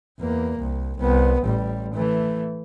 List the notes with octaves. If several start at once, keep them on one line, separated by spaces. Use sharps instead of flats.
E2 A#3
C2
C2 B3
A1 G3
E3 A3